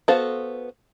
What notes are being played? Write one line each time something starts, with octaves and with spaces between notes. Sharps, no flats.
B3 F#4 A4 C5 F5